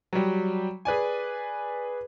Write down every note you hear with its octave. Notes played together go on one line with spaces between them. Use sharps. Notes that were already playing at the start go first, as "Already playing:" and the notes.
F#3 G3
G#4 B4 D5 G#5